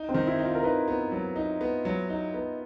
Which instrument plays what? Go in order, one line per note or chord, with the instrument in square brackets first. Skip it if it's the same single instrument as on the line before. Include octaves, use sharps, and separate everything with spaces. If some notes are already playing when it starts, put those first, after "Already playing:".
Already playing: [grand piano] D#4
[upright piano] C4
[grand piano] D#3
[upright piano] E4
[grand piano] D#4
[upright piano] F4
A#4
[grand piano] D#4 [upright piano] B4
[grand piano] B3
F#3
D#4
B3
F#3
D#4
B3